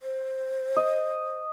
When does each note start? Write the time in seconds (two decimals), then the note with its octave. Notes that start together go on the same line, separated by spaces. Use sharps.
0.02 C5
0.77 D#5